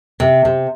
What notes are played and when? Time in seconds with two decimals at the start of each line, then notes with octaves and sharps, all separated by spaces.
0.20 C3
0.45 C3